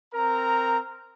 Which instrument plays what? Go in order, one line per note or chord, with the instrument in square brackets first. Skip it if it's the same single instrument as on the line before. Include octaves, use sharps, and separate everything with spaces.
[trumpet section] C4 A#4 A#5